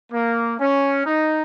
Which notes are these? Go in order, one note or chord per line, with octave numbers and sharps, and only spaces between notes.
A#3
C#4
D#4